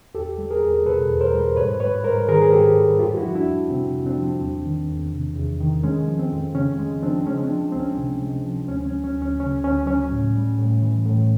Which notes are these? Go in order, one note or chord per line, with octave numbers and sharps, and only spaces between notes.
E2 G4 A4
G3
G#4 A#4
E2
B2 A4 B4
E2
A#4 C5
G3
G#2 B4 C#5
G3 B4 C#5
G#2 A#4 C5
D#3 G#4 A#4
G#4
G#2 G4 A4
G3
F2 F4 G4
E4 F#4
F3
D4 E4
F2
C3 C4
F2
C4 D4
F3
E2
D#3
E2
C3
E2
D#3
G#3 C#4
F3
C4
F2
C#3 C#4
G#3
F3 C4 D4
G#3 C#4
C4 D4
F3
C#2 C4
C#4
C3
G#3
F3
D2 C#4
C#4
F#3
C#4
D2
C#4
C#3 C#4
D2 C#4
F#3 C#4
A2
G3
A2
E3
A2